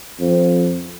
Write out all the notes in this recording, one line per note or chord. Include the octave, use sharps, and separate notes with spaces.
F2